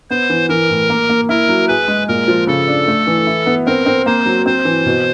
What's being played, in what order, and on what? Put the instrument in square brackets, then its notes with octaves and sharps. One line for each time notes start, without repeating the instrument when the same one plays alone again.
[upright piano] B3 [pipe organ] C5
[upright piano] E3
[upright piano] E3 [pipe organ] A#4
[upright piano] A2
A#3
A#3
[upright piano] E4 [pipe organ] A#4
[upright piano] F#3
[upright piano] G#4 [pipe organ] B4
[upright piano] G#3
[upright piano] A#2 [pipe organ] A#4
[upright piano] F3
[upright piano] C#3 [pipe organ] A4
[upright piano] D4
A3
E3
E4
B3
[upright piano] C4 [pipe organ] A#4
[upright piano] C4
[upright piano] A#3 [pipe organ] C5
[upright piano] F#3
[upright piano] C4 [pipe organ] C5
[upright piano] E3
B2